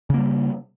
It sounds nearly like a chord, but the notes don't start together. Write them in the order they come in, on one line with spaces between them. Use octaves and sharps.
C#3 A#3 G3